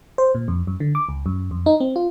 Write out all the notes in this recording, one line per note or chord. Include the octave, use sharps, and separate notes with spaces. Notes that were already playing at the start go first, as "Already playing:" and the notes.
C5
A#2
F2
F#2
D3
D6
C#2
F#2
F2
D#4
C4
F4